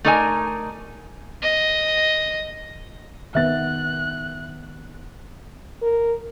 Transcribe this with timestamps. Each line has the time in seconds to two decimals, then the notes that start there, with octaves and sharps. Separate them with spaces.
0.05 A3 D#4 A#4 D5 D#5 G#5
1.43 D#5
3.35 D#3 B3 E5 F#6 A6
5.82 A#4